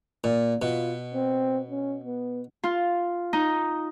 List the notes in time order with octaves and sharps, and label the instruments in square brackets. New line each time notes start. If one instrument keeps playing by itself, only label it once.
[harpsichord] A#2
[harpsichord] B2 [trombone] F4
[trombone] C4
C#4
B3
[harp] F4
D#4